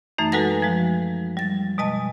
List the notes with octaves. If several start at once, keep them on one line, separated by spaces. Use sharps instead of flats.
F#2 E3 A3 D#4
G#3 F#4 A4 B4 F#5 A#6
F3 G#3
G3 A6
B2 G#3 D#5 A5